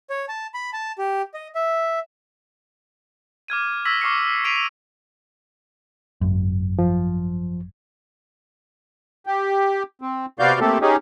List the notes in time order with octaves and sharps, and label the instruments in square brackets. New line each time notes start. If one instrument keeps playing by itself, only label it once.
[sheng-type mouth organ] C#5
A5
B5
A5
G4
D#5
E5
[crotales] D6 F6 G#6 D#7
C#6 E6 G#6 A#6 B6 F#7
C#6 D6 F6 C7 C#7
B6 C7 D7 D#7 F7
F7
[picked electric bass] G#1 F#2
[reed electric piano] F3
[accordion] G4
C4
C3 B3 F#4 D5 F5 G6
A3 A#3 C4 G4 A4
C#4 D#4 G4 G#4